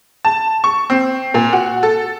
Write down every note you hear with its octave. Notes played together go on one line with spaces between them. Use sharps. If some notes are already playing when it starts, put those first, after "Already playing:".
A5
C#6
C4
A#2
F#4
A4